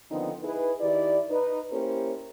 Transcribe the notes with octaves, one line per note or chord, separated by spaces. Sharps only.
D3 D#3 F3 B3 C4 D#4
D#4 E4 G#4 B4
D#3 D#4 E4 G4 D5
D#4 B4
A#3 C#4 E4 G4 A#4 C5